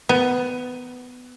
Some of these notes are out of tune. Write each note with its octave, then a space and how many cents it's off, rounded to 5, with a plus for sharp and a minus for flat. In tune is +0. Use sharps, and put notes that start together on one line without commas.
B3 +15